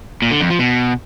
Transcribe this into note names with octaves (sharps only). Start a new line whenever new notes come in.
A#2
D3
F2
F3
B2